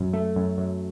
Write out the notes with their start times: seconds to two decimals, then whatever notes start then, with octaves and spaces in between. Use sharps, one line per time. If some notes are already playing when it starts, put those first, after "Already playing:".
Already playing: F#2
0.13 A3
0.36 F#2
0.58 F#2